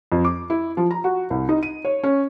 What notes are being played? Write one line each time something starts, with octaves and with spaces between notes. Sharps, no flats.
F2
D6
E4
F3
A#5
F#4
C2
D#4
D#7
C#5
C#4